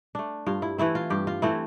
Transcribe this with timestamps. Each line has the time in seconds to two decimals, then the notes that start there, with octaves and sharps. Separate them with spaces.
0.15 A3 D4
0.46 G2 F4
0.62 E4
0.78 E3 A3 C4 E4
0.95 F4
1.10 G2 G4
1.27 F4
1.42 E3 A3 C4 E4